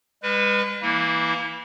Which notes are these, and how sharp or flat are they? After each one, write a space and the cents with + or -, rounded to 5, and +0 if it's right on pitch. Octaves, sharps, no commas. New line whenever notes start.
G#3 -45 B4 +0
E3 +0 A#3 +5 E4 -25